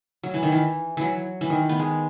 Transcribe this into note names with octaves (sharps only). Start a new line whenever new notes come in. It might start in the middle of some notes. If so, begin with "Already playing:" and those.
F#3
E3
D#3
E3
E3 F#3
E3
D#3
B3
G#3